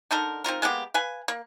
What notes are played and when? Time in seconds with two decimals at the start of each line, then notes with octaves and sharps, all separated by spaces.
0.11 D3 D#4 A4 A#4
0.44 C4 D#4 F4 A#4
0.62 G#3 A#3 B3 G4
0.94 B4 F5 G#5
1.28 A#3